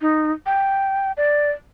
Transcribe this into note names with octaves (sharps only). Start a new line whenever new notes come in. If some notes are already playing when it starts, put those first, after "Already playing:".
D#4
G5
D5